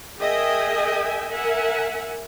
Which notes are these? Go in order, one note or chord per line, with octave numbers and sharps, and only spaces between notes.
G#4 A#4 D#5 E5 G5 G#5
A#4 E5 F#5 G#5